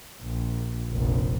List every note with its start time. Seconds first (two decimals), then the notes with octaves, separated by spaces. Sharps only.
0.23 A#1
0.90 F1 A#1